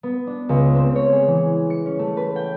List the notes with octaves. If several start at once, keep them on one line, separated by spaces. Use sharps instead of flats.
B3
D4
C#2
C4
C#5
G#4
E3
C#7
C#4
A3
B4
G5